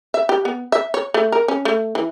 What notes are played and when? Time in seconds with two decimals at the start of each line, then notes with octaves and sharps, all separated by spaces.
0.14 E5
0.29 G4
0.45 B3
0.72 E5
0.94 C#5
1.14 A3
1.32 A#4
1.48 C#4
1.65 A3
1.95 E3